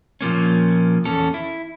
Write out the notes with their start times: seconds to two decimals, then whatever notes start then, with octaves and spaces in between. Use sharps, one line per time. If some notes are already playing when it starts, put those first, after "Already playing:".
0.21 A#2 F3 A#3 C#4
1.05 E2 C#4 A4
1.34 E4